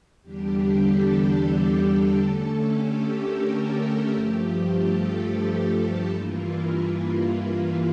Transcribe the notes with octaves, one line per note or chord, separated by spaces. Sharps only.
E2 D3 G3 D4 G4
A4
A4
A4
D3 A3 C#4
G4
A#4
G4
G2 F3 A3 G4
A4
G2 E3 A#3 E4 F4
F4